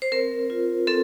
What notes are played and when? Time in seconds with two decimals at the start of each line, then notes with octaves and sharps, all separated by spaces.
0.02 C5
0.12 C4 A#4
0.50 F4
0.87 C4 A4